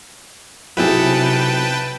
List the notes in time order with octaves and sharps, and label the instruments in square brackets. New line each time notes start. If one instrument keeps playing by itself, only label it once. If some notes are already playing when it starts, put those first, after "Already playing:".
[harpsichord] B1 [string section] C3 [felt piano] E4 G#4 [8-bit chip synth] B4 G5 A5